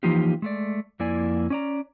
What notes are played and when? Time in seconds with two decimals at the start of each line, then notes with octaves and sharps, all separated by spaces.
0.03 E3 F3 A#3 D#4 F4 G4
0.42 G#3 A3 D5
1.00 F2 A#3 E4 D5 G#5
1.50 C#4 D5 A#5